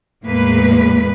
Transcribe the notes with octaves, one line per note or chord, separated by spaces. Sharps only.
E2 A2 G#3 A#3 B4